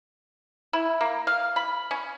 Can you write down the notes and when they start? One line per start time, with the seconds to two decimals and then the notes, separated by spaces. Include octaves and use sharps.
0.73 E4
1.01 A#3
1.27 F5
1.56 B5
1.91 C#4